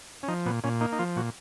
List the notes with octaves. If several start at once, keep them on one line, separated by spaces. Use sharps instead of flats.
C#4
F3 D#4
A#2 B3
A#2 C#4
A#3 D#4
D#4
F3 F4
A#2 F#4